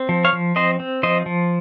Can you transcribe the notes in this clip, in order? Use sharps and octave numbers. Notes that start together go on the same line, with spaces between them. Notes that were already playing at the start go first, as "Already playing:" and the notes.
Already playing: C4
F3
C#5 F5
F3
C4 C5 D#5
C4
F3 C5 D#5
F3